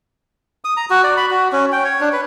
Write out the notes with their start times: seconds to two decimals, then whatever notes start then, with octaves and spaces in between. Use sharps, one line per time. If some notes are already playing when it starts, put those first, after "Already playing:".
0.65 D#6
0.77 A#5
0.90 F#4
1.04 D5
1.17 B5
1.31 F#4
1.52 C#4
1.72 G5
1.84 C#5
2.01 D4
2.13 B4